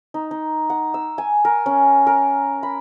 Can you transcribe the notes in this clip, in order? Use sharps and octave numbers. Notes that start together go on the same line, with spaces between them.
D#4
D#4
F#5
E6
G#5
A#4
C#4
A#4
B5